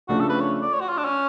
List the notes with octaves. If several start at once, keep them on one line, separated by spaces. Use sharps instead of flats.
C#3 F3 A3 D4 F#4
A4
B4
C#5
D5
C#5
F#4
F4
D4
C#4